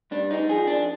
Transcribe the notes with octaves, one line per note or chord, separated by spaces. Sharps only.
G2 D4
D#4
F3 G#4
D4